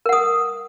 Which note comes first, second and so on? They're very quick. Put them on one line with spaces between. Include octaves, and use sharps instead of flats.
A#4 F#5 D#6